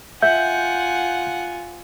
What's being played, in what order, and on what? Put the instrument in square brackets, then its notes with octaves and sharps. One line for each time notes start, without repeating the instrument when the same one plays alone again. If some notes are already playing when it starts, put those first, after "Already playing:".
[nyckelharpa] F4 G#5 [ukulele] E5 [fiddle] F#5 [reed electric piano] G6